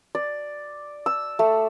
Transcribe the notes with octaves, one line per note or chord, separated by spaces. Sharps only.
D5
E6
A3